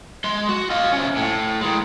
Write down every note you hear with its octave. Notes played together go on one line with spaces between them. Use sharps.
G#3 C6
F#4
F4 D#5
C3 C#4
A2
D#3 G#3